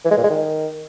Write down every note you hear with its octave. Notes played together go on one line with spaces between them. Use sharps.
E3
G#3
A#2
G#3
D#3